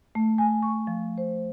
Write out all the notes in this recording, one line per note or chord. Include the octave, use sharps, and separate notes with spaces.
A3
G#5
C#6
F3
C5